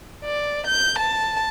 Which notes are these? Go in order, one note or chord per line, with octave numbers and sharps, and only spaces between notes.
D5
G6
A5